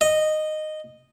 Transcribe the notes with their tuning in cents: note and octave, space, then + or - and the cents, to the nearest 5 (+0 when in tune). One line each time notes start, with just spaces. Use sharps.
D#5 -10